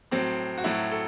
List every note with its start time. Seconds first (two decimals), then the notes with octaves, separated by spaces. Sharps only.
0.11 A2 F#3 C4
0.58 F#4
0.64 A2 F#3 E4
0.91 A4